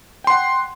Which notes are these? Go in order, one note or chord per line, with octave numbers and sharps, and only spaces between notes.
F#5 G5 C6